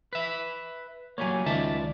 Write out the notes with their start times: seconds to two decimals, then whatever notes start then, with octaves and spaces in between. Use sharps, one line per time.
0.13 B4 E5
1.18 F#3 G3 A#3 C#5 G#5
1.46 C#2 D#3 D5 E5 A5